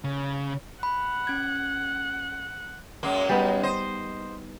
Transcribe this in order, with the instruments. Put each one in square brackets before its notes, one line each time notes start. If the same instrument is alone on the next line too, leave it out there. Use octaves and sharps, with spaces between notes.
[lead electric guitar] C#3
[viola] F#5 [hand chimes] B5
[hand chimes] C#4 G#6
[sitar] F#2 G#3 A#3
[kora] G3 B3 D#4
[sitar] C5 D#5